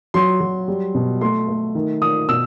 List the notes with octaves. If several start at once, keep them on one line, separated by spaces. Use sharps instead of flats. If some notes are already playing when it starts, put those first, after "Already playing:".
F#3 C6
F#3
G3
B2
A3 C6
A3
D#3
D#3 D#6
B2 E6